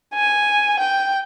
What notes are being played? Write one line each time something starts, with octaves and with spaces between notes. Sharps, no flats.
G#5
G5